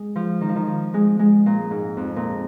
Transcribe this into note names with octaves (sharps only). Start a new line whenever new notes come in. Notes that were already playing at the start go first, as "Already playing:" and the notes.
Already playing: G#3
F3
D#3
F3
D#3
F3
G#3
G#3
A#2
G#2
F2
A#2